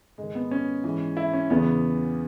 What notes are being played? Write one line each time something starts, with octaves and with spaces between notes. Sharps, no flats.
G#2 D#3 G#3
B3
C#4
G#2 E3
E4
C#4
E2 C#3 E3 B3